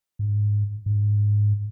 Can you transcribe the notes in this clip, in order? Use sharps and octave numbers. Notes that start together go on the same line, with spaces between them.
G#2
G#2